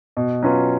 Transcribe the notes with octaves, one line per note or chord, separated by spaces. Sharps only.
B2
F#3 C#4 F4 B4